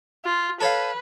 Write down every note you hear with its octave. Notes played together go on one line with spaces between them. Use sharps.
F4
A4 B4 C#5 F5